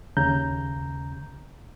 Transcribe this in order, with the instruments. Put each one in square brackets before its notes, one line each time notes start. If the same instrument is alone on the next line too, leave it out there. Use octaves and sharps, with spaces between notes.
[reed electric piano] D#2 C#3 A#5 G6